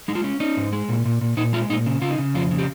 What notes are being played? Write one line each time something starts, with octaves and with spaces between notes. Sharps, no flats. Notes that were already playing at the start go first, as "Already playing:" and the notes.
G#3 D#4
F4
C#4
C#4 D#4
G#2
G#3
A#2
A#2
A#2
A#2 D#4
G#3 F4
A#2 D#4
C#3
C#3 F4
D#4
C#3
F2 F4
C#3
G4